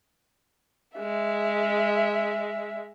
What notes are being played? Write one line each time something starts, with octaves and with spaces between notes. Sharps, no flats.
G#3 E5